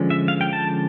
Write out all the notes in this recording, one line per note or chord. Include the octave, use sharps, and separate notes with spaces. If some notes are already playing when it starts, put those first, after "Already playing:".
Already playing: D3 F3 G#3 C#4
E5
F5
G5
A5